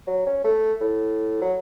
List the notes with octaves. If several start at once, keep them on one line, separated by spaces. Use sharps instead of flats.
F#3
C#4
A3
A2
F#3